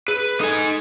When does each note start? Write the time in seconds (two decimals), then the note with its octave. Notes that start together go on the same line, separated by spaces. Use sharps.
0.08 G#4 B4
0.41 D#4 A4 G#5